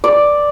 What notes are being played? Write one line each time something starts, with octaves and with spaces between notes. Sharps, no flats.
D5